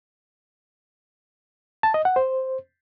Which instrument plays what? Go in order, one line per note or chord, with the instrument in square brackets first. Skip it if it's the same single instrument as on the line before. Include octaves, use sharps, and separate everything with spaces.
[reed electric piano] A5
D#5
F#5
C5